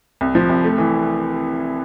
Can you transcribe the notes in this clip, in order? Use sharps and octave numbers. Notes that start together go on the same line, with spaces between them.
C2
F3
C2
A3
E3